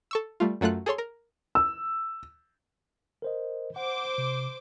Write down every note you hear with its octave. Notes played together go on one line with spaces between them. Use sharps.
A4 C#6 E6
G3 A3 F4
F#2 F#3 A3 F4 F#6
G#4 A4 C#5 C6
A#4
E6
A#4 C5 D#5
C5 F#5 D6
C3